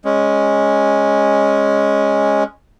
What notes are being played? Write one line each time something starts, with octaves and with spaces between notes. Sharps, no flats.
G#3 C#4